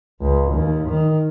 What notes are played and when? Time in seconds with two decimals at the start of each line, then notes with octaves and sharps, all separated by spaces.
0.21 C#2
0.53 D#2
0.88 D#3